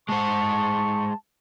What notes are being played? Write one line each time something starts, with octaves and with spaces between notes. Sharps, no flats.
G#3 C5 A5 C#6